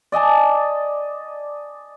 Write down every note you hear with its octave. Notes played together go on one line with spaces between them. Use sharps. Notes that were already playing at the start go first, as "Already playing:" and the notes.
D5 D#5 G#5 A5